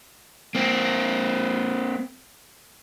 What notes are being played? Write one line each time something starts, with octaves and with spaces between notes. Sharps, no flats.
A#3 C4